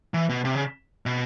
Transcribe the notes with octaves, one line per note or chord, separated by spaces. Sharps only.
E3
B2
C3
C#3
B2